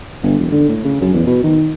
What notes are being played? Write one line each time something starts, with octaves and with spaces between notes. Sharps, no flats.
G1
E1
D3
A2
C#3
F#2
E2
B2
D#3